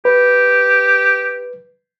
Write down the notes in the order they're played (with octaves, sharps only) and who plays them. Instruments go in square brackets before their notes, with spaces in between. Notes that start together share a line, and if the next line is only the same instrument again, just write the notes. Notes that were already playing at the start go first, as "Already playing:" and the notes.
[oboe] G4 [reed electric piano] B4